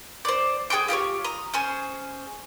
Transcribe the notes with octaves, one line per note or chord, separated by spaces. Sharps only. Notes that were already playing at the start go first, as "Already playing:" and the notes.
C5 D5
G#4 G5 C6 D6
F4 G4 A#4 C#5
A#5 D#6
C#4 G#4 C5